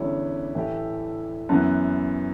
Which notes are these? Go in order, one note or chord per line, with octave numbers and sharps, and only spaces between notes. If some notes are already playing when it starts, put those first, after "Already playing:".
Already playing: E2 D3 G3 C#4 E4
A2 E3 A3 E4 G4
F#2 E3 B3